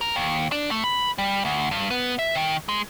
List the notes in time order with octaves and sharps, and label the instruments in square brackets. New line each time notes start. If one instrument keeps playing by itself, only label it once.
[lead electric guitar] A#4
D#2
D4
A3
B5
G3
D2
G2
B3
E5
D#3
G#3